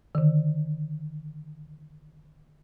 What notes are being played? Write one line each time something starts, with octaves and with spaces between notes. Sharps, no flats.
D3 D#3